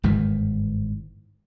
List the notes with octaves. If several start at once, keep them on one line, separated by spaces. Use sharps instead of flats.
G1 G#2 D#3 E3